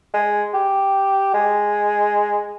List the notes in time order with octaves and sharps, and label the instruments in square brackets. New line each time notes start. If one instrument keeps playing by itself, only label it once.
[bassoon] G#3
G4
G#3